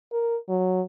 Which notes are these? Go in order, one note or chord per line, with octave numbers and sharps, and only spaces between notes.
A#4
F#3